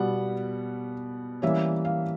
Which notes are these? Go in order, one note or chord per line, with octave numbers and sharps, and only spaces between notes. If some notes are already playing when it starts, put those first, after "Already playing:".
Already playing: B2 G3 B3 F#5
E3 G3 A#3 C#4 E5
F5